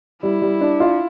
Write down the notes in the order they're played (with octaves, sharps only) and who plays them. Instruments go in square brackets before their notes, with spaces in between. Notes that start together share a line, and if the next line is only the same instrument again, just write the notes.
[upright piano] G3 [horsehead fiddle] E4
[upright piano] G3
D4
F4